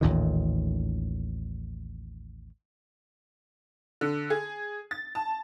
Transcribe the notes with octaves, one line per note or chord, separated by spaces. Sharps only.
A1 D#2 A#2 D#3
D3
G#4
A6
A5